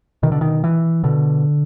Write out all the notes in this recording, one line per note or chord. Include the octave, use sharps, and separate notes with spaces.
B2 D#3
D3
D#3
E3
B2 D3